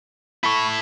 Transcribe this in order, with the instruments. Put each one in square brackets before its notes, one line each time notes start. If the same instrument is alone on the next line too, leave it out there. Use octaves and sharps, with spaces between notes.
[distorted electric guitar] E4 A4 [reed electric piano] B5 C#6